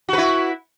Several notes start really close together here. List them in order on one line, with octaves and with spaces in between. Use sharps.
F#4 B4 E4